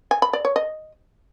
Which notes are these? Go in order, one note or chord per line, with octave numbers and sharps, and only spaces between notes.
G#5
B5
D5
C#5
D#5